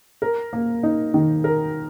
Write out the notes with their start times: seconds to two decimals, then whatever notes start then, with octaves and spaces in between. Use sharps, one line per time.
0.22 A#4
0.53 A#3
0.83 D#4
1.14 D#3
1.44 A#4